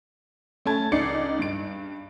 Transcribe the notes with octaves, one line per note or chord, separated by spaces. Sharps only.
A3 C#4 A5 G#6
C#2 D#4 D5 C7 C#7
G2 D7